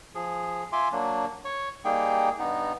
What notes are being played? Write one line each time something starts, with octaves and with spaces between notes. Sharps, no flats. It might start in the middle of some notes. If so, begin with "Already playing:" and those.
F3 G#4
F4 E5 G#5 C6 D6
F#3 A#3 D4
C#5 C#6
G3 A#3 D#4 G#4 G5
G2 B3 D#4